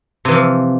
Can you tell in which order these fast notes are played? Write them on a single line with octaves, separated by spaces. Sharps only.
C3 E3 F3